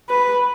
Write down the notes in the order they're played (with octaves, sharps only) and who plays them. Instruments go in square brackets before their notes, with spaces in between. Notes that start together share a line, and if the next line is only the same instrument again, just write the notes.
[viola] B4